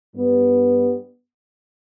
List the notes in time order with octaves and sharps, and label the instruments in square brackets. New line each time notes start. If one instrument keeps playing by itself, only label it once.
[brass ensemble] G2 G3 B3